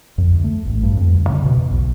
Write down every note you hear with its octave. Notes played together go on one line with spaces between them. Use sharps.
F2
D2
A3
A1
G2
F2
D2
C#3
B2
E2
B1